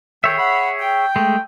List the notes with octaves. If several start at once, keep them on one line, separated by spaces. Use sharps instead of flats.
D#3 G#4 A4 C#5 E5 G5
F#5 B5
G5
G#3 A3